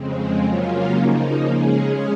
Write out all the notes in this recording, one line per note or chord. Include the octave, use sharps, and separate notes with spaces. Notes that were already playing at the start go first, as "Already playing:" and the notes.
Already playing: F2 C#3 G#3 C4
C#3 F#3 A#3 C#4 F4
C#3 F3 A#3 D#4
C#3 G#3 C#4 G#4